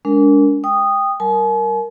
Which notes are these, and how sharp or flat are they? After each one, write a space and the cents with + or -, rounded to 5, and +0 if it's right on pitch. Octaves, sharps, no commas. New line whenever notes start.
G#3 +0 D4 -35 A#4 +0
G5 +10 D#6 -10
G3 -40 A#4 +0 G#5 +45